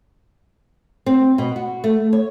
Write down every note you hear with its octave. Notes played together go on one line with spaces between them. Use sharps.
C4
B2
F#4
A3
C#5